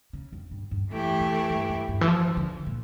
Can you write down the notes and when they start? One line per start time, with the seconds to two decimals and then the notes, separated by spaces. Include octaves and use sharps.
0.13 C#3
0.33 F2
0.51 G2
0.71 G2
0.91 F2 E3 A3 E4 G4
1.20 F2
1.50 G2
1.69 G2
1.88 G2
2.01 E3
2.08 F3
2.37 D3
2.66 A#2